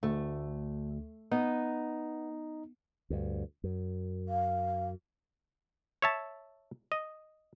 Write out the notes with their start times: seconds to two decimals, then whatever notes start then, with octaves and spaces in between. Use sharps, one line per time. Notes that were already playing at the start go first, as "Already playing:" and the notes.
0.03 D2 A3
1.32 B3 D#4
3.10 D2 G2
3.64 F#2
4.29 F5
6.02 C#5 E5 A5
6.92 D#5